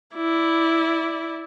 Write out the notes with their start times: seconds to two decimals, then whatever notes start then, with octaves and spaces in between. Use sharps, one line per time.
0.15 E4 D5